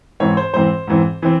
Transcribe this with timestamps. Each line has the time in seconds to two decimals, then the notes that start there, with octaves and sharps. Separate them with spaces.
0.20 G#2 E3 C4 C#5
0.37 C5
0.54 G#2 E3 C4 C5
0.87 G#2 E3 C4
1.22 E3 C4